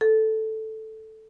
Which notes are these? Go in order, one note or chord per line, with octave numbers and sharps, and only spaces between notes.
A4